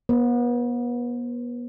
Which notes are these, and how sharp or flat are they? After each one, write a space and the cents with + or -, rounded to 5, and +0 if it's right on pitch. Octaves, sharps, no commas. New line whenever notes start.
B3 -35 C5 +25